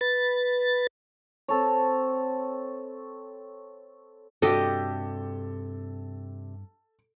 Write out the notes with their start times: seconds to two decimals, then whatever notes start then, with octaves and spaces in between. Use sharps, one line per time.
0.01 B4 A6
1.48 C4 A4 C#5
4.42 G2 C3 D4 F#4 G4 A4 D#5